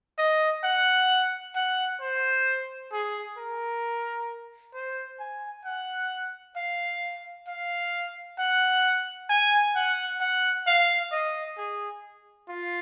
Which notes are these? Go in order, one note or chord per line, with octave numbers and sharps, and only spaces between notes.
D#5
F#5
F#5
C5
G#4
A#4
C5
G#5
F#5
F5
F5
F#5
G#5
F#5
F#5
F5
D#5
G#4
F4